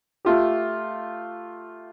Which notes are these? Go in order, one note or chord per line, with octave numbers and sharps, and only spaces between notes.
A3 F4 G4